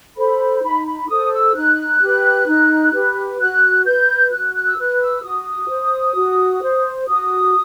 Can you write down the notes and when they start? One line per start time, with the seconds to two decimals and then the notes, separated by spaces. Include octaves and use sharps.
0.17 A4 C5 B5
0.63 D#4 B5
0.86 B5
1.09 A4 C5 D#6
1.32 E6
1.55 D#4 F#6
2.01 G4 B4
2.47 D#4
2.93 G4 B4
3.39 F#4 F#6
3.85 B4 G6
4.31 F#4 F#6
4.54 F#6
4.67 E6
4.77 B4 F#6
5.01 E6
5.24 F#4 D#6
5.69 C5
6.15 F#4
6.62 C5
7.08 F#4 D#6